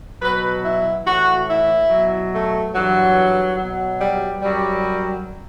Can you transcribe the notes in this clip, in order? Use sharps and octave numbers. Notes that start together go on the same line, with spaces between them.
B2 F#3 B4
E4
A2 E3 F#4
E4
B2 F#3
A3
G2 E3 F#3
B2 F#3
G3
F#2 F#3 G3